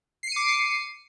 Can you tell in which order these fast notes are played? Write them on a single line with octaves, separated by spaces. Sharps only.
C7 C#7 D#7 D6